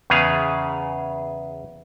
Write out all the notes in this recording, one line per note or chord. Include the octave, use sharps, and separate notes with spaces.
E2 C#3 B3 G#4 F5 G#5